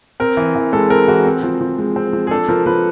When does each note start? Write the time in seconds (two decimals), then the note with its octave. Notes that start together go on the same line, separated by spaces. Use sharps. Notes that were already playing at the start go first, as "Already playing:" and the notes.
0.20 C4 A#4
0.37 E3
0.56 E3
0.73 G#3 A4
0.90 C4 A#4
1.08 E3 F#4
1.26 C4
1.43 F3
1.61 F3
1.78 G#3
1.96 C4
2.13 F3
2.27 G#4
2.31 D4 A4
2.48 F3 A#4
2.66 F3 B4